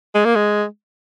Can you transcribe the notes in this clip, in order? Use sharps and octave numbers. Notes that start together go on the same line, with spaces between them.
G#3
A#3
G#3